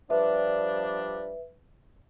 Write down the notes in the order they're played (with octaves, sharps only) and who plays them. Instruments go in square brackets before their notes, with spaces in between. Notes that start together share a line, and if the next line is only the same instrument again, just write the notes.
[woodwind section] F3 G3 D4 [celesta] B4 E5